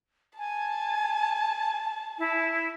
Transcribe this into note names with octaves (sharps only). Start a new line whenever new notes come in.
G#5 A5
E4